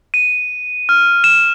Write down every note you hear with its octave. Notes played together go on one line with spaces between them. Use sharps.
D#7
F6
E7